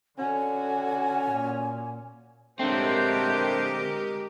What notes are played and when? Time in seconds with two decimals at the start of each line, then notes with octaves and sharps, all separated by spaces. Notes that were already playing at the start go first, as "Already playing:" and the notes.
0.18 D3 C#4 F#4 G#5
1.31 A#2
2.59 D3 G#3 A3 C4 D4 G4 A#4 C5